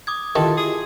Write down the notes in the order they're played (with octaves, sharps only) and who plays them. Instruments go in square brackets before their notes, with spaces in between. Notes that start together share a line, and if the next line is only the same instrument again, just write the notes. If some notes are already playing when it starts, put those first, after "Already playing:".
[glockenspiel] D6 D#6 G#6
[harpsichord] D#3 [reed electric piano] E4 F4 G4 [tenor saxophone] A4 [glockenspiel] C6
[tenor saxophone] G#4